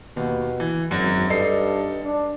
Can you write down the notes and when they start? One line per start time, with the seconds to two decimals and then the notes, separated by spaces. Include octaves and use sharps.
0.17 D#2 B2
0.60 E3
0.91 G#1 F#2 F#3
1.30 G2 D#4 A4 C7
2.04 D4